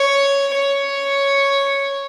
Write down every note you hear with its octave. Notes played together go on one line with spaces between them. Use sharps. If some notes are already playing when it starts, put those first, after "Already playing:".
Already playing: C#5
C#5